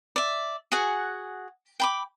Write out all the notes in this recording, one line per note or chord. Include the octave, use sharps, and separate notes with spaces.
D5 E5
F#4 G#4 F#5 G#5
G5 B5 D6